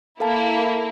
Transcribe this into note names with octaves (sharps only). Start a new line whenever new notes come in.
A#3 E4 A4 F5 A5